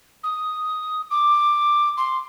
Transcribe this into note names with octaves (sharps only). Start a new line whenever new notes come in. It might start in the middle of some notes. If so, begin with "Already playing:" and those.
D#6
D6
C6